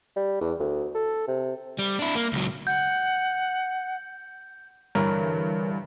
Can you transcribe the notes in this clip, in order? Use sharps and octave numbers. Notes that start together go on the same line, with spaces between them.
G3
E2
D2
A4
C3
G3
D4 E4
A#3
C#2 F#3
F#5 G6
G2 D3 E3 A#4 C#5 A#5